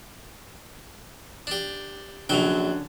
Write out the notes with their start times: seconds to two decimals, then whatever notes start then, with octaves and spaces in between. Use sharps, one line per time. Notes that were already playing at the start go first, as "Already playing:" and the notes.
1.47 D4 G4
2.29 A#1 D3 F#3 C#4 G5 F7